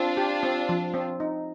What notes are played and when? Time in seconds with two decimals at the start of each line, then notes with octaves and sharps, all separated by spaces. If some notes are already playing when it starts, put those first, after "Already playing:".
Already playing: C4 D4 F4
0.17 G4
0.43 C4
0.69 F3
0.94 C4
1.20 D#4